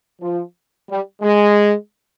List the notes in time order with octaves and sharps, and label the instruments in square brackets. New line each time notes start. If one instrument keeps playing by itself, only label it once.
[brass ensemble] F3
G3
G#3